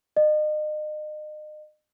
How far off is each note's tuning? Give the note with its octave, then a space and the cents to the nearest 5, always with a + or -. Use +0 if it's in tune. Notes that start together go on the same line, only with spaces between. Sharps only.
D#5 -35